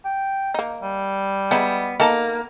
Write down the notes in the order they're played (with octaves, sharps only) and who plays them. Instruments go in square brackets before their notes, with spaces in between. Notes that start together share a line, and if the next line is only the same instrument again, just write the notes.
[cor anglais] G5
[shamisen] A#3 D#4
[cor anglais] G3
[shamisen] G#3 D#4 E4 [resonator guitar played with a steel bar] B3
[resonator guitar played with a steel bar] A#3 [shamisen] D#4 A4 A5